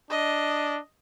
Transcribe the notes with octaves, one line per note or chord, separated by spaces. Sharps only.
D4 D#5